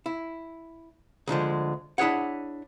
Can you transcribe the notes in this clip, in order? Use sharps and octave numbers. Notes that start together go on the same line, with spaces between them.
E4
D2 D3 F3 G#3
D4 E4 G#4 C#5 F#5